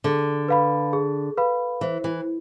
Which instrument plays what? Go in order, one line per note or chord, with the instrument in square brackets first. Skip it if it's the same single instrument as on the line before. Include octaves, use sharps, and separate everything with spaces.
[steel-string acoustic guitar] D3 [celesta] G#4
[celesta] B4 F5 B5
G#4
B4 F5 B5
[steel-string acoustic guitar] E3 [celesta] C5
[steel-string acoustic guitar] E3